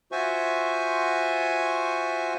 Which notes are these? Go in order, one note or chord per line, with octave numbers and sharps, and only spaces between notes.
F4 F#4 C5 E5 G#5 C#6